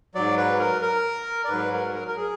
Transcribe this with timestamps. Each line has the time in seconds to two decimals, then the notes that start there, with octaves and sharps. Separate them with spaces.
0.15 G#2 F#3 D5
0.37 B4
0.59 A#4
0.82 A#4
1.45 D5
1.49 G#2 F#3 B4
1.72 A#4
1.95 A#4
2.08 A#4
2.17 G#4